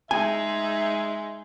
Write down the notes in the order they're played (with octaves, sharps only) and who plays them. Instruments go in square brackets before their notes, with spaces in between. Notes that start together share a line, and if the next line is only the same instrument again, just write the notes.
[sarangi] G#3 [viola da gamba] D#4 G#4 [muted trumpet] E5 [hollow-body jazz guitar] G#5